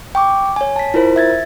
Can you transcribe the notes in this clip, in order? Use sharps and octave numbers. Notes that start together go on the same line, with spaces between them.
G5 C#6 D6
C#5 G#5
A5 B6
E4 F4 A#4 C5
E5 G#6 A6